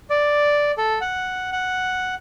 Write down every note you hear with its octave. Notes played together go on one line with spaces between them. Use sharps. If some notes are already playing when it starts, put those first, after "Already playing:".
D5
A4
F#5
F#5